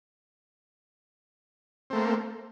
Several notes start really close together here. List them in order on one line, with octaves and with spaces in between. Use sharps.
C4 A3 A#3